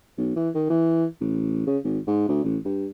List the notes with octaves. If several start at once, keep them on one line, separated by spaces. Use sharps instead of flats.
B1
E3
D#3
E3
A1
C#3
G#1
G#2
D2
A1
G2